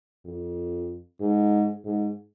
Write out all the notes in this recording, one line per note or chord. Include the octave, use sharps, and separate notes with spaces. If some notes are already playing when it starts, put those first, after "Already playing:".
F2
G#2
G#2